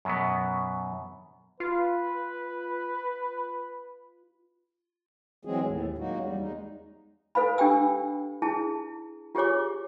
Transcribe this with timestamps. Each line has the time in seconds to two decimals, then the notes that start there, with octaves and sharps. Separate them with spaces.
0.05 F#2 B2 F#3 B3
1.60 F4 B4
5.45 E3 F#3 G#3 C4 G#4
5.64 D#2 A2
5.98 F#3 G#3 A#3 D#4 F#4
6.20 E2 G3
6.39 G#3 D#4
7.35 A4 B4 F5 B5
7.58 D4 G4 G5 E6
8.42 E4 G#4 A5
9.35 F4 G4 G#4 C#5 D6